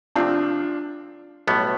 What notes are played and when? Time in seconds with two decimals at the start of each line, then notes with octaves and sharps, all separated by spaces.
0.16 C3 F3 A3 C4 D4 F4
1.47 B1 A2 G3 B3